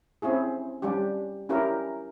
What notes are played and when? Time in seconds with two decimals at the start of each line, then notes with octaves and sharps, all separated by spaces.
0.22 C4 C#4 E4 G#4
0.82 G3 C#4 D4 G4
1.49 C#4 D4 E4 G4 A#4